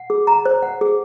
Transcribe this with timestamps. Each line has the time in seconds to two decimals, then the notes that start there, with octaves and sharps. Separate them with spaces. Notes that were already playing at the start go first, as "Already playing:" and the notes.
Already playing: F#5
0.10 G#4
0.27 A#5
0.45 C5
0.63 F#5
0.81 G#4